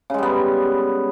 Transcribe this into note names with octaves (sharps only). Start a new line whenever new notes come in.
C#3 G3 G#3 B3